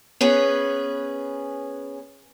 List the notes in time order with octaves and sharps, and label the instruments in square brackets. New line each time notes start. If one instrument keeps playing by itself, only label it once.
[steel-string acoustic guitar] B3 C#4 G#4 B4